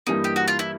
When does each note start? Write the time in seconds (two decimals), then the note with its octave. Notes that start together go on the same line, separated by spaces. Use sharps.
0.07 G2 E3 G3 A#3 D#4
0.24 G4
0.36 F#4
0.48 F4
0.59 E4